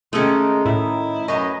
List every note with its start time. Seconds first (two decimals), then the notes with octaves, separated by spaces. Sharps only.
0.13 D#3 G#3 A3 C#4 D#4
0.65 A2 E4
1.28 F#2 B4 D#5 G#5